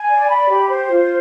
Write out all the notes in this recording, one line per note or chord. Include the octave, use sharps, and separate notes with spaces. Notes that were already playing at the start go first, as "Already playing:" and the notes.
Already playing: G#5
D5
B5
G4
C5
F4